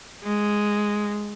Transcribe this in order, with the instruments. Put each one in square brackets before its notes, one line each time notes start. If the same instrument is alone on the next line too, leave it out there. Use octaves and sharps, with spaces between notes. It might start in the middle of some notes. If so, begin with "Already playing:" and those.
[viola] G#3